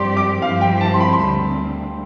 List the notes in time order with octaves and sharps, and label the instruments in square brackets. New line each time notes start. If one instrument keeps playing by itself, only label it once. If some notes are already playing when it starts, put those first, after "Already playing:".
Already playing: [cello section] G2 F3 C4 G4 D5 [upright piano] C6
[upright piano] D6
[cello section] G2 F3 C4 E4 G4 [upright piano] F5
[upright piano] G5
A5
C6
B5
C6
[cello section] D2 D3 G3 C4 [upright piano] B5